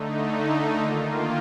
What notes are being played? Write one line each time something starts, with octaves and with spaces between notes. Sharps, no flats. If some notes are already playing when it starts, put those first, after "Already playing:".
Already playing: D3 A3 D#4
D#3 A#3 F4